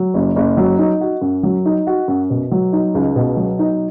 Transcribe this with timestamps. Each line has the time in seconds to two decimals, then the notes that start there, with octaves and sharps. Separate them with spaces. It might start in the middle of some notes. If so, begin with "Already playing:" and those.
Already playing: F#3
0.14 F#1
0.36 F#1
0.57 F#3
0.78 D#4
1.01 F#4
1.21 F#2
1.43 F#3
1.66 D#4
1.87 F#4
2.08 F#2
2.30 B2
2.52 F#3
2.73 D#4
2.95 C#2
3.16 B2
3.37 F#3
3.59 D#4